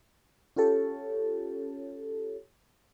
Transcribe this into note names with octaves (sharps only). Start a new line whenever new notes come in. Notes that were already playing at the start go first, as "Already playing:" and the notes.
C#4 F4 G4 A4 C#5